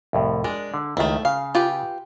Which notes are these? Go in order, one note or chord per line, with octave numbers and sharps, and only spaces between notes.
C2 F2 A2
G#3 D4 A#4
D3
C#2 D#3 A3 E4
C#3 F5
F4 G4 B4